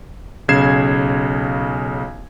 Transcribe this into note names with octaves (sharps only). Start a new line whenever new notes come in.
B1 C#3 G#6 C7 E7